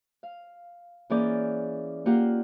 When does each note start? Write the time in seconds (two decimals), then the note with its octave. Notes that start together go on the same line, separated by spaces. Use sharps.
0.23 F5
1.10 E3 A#3 C#4 G#4 D5 G6
2.06 A#3 F4 G4 F#5